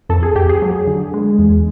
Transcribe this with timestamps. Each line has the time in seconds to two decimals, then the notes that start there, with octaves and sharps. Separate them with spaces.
0.09 F2 A4
0.23 G#4
0.35 F2 G4
0.49 G#4
0.62 F#3
0.87 D3
1.14 G#3
1.39 E2